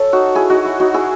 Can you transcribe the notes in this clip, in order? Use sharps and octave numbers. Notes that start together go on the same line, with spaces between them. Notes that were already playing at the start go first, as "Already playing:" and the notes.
Already playing: A4 C#5
D#4 F#4
E4 G#4
D#4 F#4
E4
D#4 F#4
E4 G#4